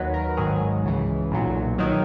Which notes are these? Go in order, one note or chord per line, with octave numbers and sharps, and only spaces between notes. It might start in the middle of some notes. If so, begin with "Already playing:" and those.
Already playing: D#2 D#3 F#3 B4
A#4
G#1 G#2 D#3 F#3 G#4
C#2 C#3 E3
B1 A#2 F#3
D#3 F#3